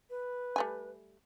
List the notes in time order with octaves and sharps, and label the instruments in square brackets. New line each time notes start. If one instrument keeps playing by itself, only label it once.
[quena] B4
[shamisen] G3 A3 G#5